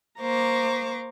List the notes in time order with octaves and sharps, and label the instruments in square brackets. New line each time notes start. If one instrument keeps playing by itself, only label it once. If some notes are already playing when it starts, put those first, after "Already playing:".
[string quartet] A#3 C5 A#5 C#6 D6